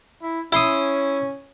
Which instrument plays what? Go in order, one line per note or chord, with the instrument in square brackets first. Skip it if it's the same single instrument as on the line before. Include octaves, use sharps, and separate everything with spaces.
[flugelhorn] E4
[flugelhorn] C#4 [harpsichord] E4 C6 D#6